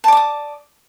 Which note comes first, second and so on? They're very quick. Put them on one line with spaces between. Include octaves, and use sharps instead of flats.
A5 D5 D6 D#6